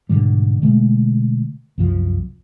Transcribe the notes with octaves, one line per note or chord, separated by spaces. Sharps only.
G#2 B2 D3 G3
B2 D3 G#3 A3
C2 F#2 F3